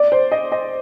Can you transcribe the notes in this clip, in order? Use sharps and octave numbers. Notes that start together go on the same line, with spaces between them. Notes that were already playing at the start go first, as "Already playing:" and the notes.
Already playing: D5
C5
D#5
D#5